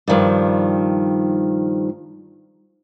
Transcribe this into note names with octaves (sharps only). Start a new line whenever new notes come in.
G2 D#3 F3 G3